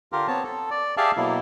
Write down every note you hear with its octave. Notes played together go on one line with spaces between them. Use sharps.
D3 F4 G4 A#4
B3 C4 C#5 A5
A4
D5
G4 G#4 D5 E5 F5 A5
B2 F#3 A#3 E4